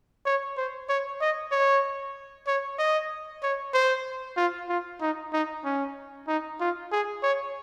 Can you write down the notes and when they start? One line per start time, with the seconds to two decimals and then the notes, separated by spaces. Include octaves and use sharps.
0.25 C#5
0.57 C5
0.89 C#5
1.21 D#5
1.52 C#5
2.47 C#5
2.78 D#5
3.43 C#5
3.74 C5
4.37 F4
4.69 F4
5.01 D#4
5.33 D#4
5.65 C#4
6.28 D#4
6.60 F4
6.92 G#4
7.23 C#5